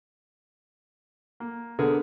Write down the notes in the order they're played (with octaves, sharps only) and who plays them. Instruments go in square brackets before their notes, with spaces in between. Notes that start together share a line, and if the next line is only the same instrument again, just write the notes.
[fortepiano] A#3
[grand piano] D3 [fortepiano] B3 G#4 A#4